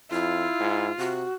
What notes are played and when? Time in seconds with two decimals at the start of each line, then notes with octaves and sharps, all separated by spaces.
0.11 F2 E4 F4
0.60 G#2
0.98 C3 F#4